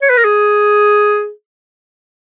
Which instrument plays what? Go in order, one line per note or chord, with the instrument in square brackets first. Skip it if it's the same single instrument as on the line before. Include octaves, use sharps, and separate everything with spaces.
[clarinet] C#5
B4
A#4
G#4